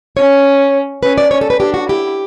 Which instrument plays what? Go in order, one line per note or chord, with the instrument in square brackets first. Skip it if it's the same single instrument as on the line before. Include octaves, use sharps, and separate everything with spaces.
[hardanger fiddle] C#4 [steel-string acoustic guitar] C#5
[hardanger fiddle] C#4 [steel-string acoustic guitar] B4
[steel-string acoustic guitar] D5
[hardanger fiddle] C#4 [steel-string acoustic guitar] C#5
[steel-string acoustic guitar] A4
B4
[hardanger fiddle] D4 [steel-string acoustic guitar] G4
[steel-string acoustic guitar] F#4
[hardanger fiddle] E4 [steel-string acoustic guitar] G4